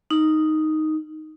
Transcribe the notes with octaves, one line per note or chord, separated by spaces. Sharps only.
D#4